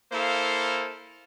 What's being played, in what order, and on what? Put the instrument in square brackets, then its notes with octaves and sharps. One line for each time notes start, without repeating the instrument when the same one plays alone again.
[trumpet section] A#3 E4 A4 C5 F5